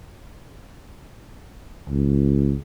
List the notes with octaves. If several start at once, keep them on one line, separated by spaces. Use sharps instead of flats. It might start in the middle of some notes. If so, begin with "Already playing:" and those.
C#2